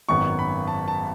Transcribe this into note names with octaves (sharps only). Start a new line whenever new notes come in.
G#1 F#2 D#3 F#3 B3 C#6
B5
A5
A5